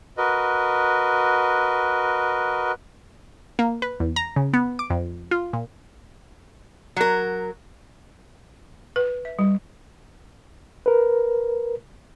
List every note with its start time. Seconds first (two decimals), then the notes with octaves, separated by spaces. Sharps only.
0.18 F#4 A#4 B4 D#5
3.59 A#3
3.82 B4
4.00 E2
4.16 A#5
4.36 C#3
4.53 B3
4.79 D6
4.90 F2
5.31 F4
5.53 A#2
6.96 F#3 A#4
8.96 B4
9.25 E5
9.39 G3
10.86 A#4 B4